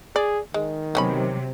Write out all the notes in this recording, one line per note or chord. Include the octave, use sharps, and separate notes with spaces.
G#4 D5
D#3 G#3
C3 F#3 B3 C#4 B5